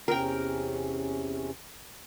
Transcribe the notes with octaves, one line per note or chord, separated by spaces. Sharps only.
E2 C3 C#4 A#4 G5